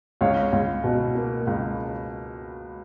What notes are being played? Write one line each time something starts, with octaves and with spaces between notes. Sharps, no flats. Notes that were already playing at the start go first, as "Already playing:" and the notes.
C#2 C#5 F5
C#2
B2
A#3
C#2